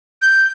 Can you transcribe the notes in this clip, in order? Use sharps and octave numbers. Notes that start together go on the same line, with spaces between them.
G6